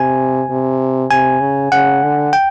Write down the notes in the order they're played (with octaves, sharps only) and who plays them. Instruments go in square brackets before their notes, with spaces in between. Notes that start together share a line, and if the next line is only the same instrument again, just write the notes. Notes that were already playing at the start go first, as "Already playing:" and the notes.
Already playing: [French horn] C3 [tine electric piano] G#5
[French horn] C3
[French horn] C3 [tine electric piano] G#5
[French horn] C#3
[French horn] C#3 [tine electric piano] F#5
[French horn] D3
[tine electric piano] G5